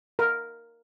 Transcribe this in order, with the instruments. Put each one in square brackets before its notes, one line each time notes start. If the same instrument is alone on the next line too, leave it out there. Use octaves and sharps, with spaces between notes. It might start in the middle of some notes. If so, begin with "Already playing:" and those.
[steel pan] A#4